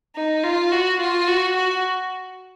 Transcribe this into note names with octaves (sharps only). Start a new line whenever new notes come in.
D#4
F4
F#4
F4
F#4
F#4